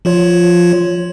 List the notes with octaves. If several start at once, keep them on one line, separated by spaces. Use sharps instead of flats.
F3 F4 C#5